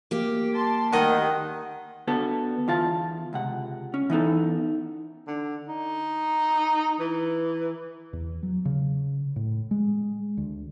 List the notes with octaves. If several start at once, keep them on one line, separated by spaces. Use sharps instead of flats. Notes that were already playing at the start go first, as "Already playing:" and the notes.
A#3 G4
A5 C6
D2 D#3 D#5 F#5
D3 B3 F#4 A4
E2 D3 F4 F5 A5
C#2 C3 F#5
C#4
E3 B3 D#4 A4
D3
D#4
E3
E2
F#3
C#3
A2
G#3
D2